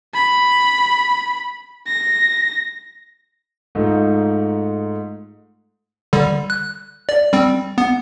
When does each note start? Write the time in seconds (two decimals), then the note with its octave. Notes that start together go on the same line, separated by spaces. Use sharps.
0.14 B5
1.87 A#6
3.75 G#2 A3 D#4 F4
6.13 D3 G3
6.50 F#6
7.09 D5
7.33 G3 C4
7.78 B3